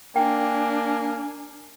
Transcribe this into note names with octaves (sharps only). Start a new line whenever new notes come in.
A#3 D4 G5 G#5